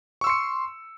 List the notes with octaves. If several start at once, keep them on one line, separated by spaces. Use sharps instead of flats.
C6 C#6 E6 C#7